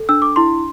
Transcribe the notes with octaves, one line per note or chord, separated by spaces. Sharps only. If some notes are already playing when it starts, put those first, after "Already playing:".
Already playing: A4
D4 E6
D6
E4 C6